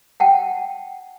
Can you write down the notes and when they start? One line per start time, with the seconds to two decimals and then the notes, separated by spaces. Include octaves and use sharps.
0.20 F#5 G5 A5